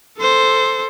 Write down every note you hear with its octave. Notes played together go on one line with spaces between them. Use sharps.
A4 C5